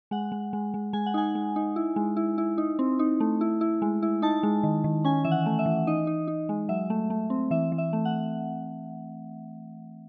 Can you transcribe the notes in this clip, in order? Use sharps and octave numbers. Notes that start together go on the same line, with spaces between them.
G#3 F#5
G#3
G#3
G#3
G#3 G#5
F#5
D#4 G#5
G#3
D#4
E4
G#3
E4
E4
D#4
C4
D#4
A3
E4
E4
G#3
E4
D#4 A5
G#3
D#3
D#3
C#4 G#5
E3 E5
F#5
A3
E5
E3
D#4 D#5
D#4
D#4
G#3
F#3 E5
A3
A3
C4
E3 E5
E3
E5
A3
F#5